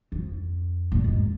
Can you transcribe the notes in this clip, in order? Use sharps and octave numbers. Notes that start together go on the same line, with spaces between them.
F2
A#2
G#2